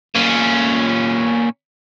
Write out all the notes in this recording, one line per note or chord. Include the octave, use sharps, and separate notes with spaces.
A#2 C#4